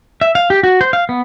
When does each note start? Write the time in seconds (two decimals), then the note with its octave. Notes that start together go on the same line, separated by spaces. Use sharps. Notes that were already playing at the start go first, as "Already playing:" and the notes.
0.21 E5
0.35 F5
0.50 G4
0.63 F#4
0.81 C5
0.93 F5
1.09 B3